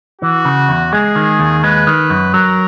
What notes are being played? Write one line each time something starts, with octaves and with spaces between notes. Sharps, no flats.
E3 F#4
C#3
E2
G#3 G#4
D#3
D#2
G#3 B4
D#3
F#2
F#3 A#4